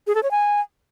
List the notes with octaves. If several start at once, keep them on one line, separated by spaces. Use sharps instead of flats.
G#4
A4
C#5
G#5